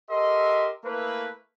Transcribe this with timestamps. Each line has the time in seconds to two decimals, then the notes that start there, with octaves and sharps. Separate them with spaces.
0.10 G4 A4 A#4 D#5 E5 C6
0.85 A3 A#3 E4 B4